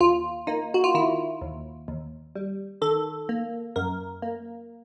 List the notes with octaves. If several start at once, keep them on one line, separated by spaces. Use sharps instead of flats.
D#2 F4
A#3 D#4
F#4
F4
D#3 E4
D#2
D#2
G3
D#3 A4
A#3
F#2 A#4
A#3